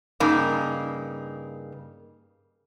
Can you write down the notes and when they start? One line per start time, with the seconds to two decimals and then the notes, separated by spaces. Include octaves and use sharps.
0.20 G2 C#3 A#3 D#4